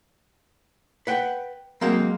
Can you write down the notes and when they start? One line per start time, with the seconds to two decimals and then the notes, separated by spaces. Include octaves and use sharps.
1.07 B4 F#5 G5
1.81 F#3 G#3 A#3 C4